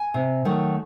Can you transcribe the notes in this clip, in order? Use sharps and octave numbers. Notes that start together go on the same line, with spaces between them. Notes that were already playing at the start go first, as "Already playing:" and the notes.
Already playing: G#5
C3
D#3 F#3 A3